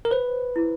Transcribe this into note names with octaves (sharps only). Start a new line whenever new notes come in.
A#4
B4 C5
E4